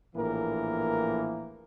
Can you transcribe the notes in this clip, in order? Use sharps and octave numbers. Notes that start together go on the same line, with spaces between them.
A#1 A2 E3 A#3 A#4